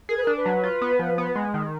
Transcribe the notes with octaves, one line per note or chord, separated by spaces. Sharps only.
G#4 A#4
B4
A#4
D4
B4
F#3
F4
B3
F3
B3
G#3
D#3